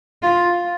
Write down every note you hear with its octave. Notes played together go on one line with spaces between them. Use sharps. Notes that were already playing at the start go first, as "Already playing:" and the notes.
F4